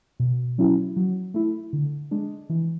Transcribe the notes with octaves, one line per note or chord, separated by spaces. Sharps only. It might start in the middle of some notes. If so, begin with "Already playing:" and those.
B2
F#3 C#4 E4
F#3
A3 E4
D3
G#3 D4
E3